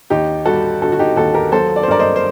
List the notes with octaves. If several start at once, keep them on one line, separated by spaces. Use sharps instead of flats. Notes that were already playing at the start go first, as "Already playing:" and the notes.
D#2 D#4 G4
G3 F#4 A4
D3 F#4 A4
F#4
D#4 G4
D#2 F#4 A4
G4 A#4
F#3 A4 C5
D5
C5
G2 A#4 D5
C5 D#5
C5